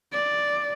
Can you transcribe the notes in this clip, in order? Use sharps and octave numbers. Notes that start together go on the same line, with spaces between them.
D5